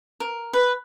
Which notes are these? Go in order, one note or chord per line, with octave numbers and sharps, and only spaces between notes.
A#4
B4